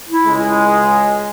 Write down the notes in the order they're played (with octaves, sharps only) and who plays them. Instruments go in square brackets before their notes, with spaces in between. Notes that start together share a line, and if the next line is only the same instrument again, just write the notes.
[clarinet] E4
[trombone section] C#2 C#3 G#3